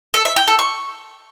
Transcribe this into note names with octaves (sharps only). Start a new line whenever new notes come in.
A4
E5
G5
A4
C#6